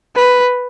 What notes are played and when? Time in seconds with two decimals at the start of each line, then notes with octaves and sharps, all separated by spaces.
0.16 B4